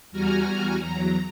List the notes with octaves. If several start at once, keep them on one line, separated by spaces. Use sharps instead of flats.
E2 G3 F#4 G#5 A#5 F6
E2 F#3 A#5